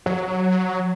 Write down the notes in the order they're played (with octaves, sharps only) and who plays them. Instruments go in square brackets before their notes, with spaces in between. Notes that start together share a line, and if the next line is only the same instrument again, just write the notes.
[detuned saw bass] F#3